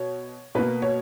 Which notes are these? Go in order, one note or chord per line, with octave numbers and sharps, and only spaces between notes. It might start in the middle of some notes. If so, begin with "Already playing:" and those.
Already playing: B2 C#5
B2 A#3 B4
C#5